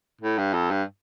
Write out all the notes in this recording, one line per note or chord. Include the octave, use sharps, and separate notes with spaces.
A2
G2
F2
G2